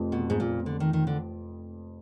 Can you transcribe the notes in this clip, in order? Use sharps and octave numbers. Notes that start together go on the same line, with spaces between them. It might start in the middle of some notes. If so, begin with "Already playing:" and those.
Already playing: F1 F2
B2
G#2
A#2
D3
D#3
D#3
D3